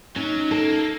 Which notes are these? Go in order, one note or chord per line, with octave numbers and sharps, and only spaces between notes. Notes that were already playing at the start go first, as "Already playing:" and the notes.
F#3 C#4 D#4
A#3 A4